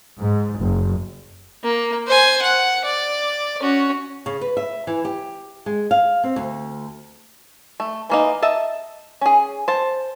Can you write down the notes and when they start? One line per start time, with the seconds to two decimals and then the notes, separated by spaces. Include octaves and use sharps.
0.20 G#2
0.60 F#1
1.64 A#3
2.07 C5 G#5
2.42 F#5
2.84 D5
3.61 C#4 F#4
4.26 C#3
4.41 B4
4.57 E5
4.87 E3
5.05 G4
5.66 G#3
5.91 F5
6.24 C4
6.36 D2
7.80 A3
8.10 E3 A#3 D#4
8.42 D#5 E5 A5
9.21 C#4 G#4
9.68 C5 A5